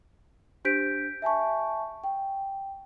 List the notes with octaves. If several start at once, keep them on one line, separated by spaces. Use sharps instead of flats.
D4 G4 C5 G6 B6 D7
E5 G#5 A5 C#6
G5